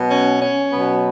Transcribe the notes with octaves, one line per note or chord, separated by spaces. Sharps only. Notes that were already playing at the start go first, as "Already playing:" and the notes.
Already playing: B2 F#3 B3
C#4
C#4
B2 F#3 B3